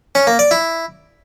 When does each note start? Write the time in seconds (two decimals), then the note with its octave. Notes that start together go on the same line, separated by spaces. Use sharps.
0.15 C#4
0.27 A#3
0.39 D5
0.51 E4